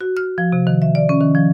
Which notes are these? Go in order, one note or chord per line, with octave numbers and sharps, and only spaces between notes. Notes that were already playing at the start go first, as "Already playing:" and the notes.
F#4
F6
F3
C3
D#3
E5
D5
C#4
D#3
F3